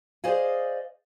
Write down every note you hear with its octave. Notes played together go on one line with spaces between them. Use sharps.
G#4 C5 D5 D#5 F5 G#5